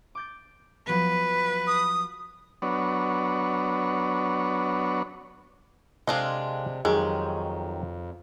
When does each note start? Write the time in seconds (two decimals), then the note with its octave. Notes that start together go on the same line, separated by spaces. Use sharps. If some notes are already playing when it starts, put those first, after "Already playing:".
0.15 D6 G6 A6
0.87 F3 F#3 B3 B4
1.67 D#6
2.62 F#3 B3 D4 C#5
6.07 C3 G#3 C4 D4 A4 D#5 F5
6.85 F2 D#3 F#3 G#3 G4 G#4